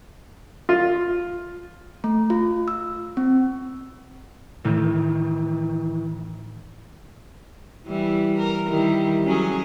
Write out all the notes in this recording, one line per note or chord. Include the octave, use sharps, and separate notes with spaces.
F4
A3
F4
E6
C4
A2 D#3 E3
E3 G3 E4
A#4
D#3 G3 E4
F#3 C#4 G#4